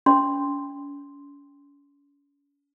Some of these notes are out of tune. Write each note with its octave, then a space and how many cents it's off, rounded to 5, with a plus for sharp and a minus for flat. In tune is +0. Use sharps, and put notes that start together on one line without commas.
C#4 +40 C6 +0